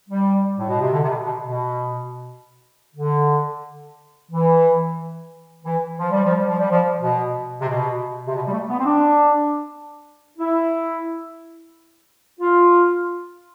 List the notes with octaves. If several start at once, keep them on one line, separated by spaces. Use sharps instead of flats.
G3
A2
B2
C3
D3
C3
B2
B2
B2
D3
E3
E3
F3
G3
F3
G3
F3
G3
F3
B2
C3
B2
C3
B2
G3
A3
B3
C4
D4
E4
F4